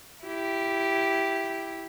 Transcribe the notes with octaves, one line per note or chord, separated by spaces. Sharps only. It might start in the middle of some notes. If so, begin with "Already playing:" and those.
E4 G4